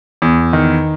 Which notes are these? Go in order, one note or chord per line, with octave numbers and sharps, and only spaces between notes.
E2
D#3